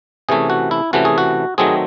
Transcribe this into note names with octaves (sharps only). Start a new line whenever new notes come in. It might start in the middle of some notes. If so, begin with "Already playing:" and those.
C3 E3 A3 C#4 G#4
F#4
E4
C3 E3 A3 C#4 F#4
G#4
F#4
D#3 F#3 A3 C4 G#4